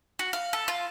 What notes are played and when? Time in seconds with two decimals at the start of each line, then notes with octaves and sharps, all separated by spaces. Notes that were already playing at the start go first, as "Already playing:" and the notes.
0.19 F#4
0.33 F5
0.53 A4
0.68 F4